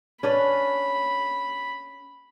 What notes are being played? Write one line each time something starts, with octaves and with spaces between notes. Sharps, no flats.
C#4 D4 B4 B5